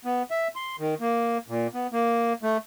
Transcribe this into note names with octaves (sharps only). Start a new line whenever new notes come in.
B3
E5
C6
D#3
A#3
A#2
B3
A#3
A3